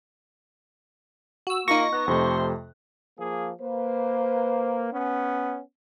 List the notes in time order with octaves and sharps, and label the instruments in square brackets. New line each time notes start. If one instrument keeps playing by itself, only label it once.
[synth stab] F#4 E6
[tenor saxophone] A#3 [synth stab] D#4 A#6 [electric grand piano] F4 [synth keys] C#6
[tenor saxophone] B3 [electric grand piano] F#6
[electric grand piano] F2 C3 A3 [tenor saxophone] C5
[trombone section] F3 A#3 G#4
[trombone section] A#3 [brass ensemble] B4 C5
[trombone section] B3 C#4